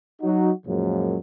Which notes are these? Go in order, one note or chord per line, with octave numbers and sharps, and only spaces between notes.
F#3 D#4 F#4
F#2 A#2 C#3 F3 F#3 G#3